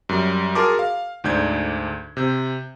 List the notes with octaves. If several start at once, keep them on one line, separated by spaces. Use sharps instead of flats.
F#2 G3
F#4 G#4 A#4 A5 C6 D6
F5
D2 G#2 D4 G6 G#6
C3 G6